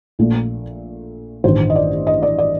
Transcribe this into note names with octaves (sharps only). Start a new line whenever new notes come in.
A#1 A#2 A3
A1 G2 D#3 C5
D#5
D5
D#5
D5
D5